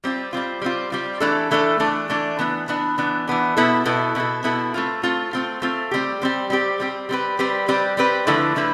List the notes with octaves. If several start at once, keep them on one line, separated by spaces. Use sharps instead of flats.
G3 C4 F4
G3 C4 F4
G3 C4 F4
G3 C4 F4
E3 A3 D4 A4
E3 A3 D4 A4
E3 A3 D4 A4
E3 A3 D4 A4
E3 B3 D4
E3 B3 D4
E3 B3 D4
E3 B3 D4
B2 B3 E4 A4
B2 B3 E4 A4
B2 B3 E4 A4
B2 B3 E4 A4
A3 C4 F4
A3 C4 F4
A3 C4 F4
A3 C4 F4
G3 C4 G4
G3 C4 G4
G3 C4 G4
G3 C4 G4
G3 C4 G4 B4
G3 C4 G4 B4
G3 C4 G4 B4
G3 C4 G4 B4
D3 F3 A3 E4 B4
D3 F3 A3 E4 B4